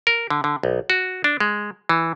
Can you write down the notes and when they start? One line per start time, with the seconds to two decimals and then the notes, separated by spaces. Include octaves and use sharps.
0.07 A#4
0.30 D3
0.44 D3
0.63 B1
0.90 F#4
1.24 D4
1.40 G#3
1.89 E3